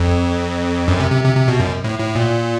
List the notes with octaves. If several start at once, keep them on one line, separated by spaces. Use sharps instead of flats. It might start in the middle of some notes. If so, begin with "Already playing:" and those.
Already playing: F2
F#2
C3
C3
C3
C3
B2
F#2
A2
A2
A#2